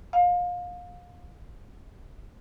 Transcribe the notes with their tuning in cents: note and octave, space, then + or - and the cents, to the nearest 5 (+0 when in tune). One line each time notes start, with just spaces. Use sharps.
F5 +30